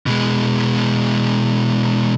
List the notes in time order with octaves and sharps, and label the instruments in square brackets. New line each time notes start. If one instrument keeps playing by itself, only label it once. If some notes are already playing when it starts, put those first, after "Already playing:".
[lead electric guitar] B2 G#3